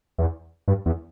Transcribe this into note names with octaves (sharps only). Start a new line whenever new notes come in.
E2
G2
E2